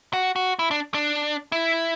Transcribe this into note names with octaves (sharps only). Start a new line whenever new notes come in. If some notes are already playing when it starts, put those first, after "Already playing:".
F#4
F#4
E4
D4
D4
E4